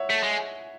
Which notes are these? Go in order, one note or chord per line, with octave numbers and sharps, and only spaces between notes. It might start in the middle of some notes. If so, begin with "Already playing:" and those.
Already playing: C#5 E5 F#5
A3
G#3